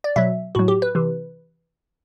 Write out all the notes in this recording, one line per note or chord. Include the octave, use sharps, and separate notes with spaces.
D5
B2 F#3 E5
A2 F#3 F#4
G4
B4
C3 E3